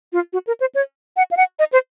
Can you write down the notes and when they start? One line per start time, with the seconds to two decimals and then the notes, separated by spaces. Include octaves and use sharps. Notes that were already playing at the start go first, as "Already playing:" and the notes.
0.13 F4
0.33 F#4
0.47 A#4
0.60 C5
0.75 C#5
1.17 F#5
1.31 F5
1.37 F#5
1.59 D#5
1.73 C5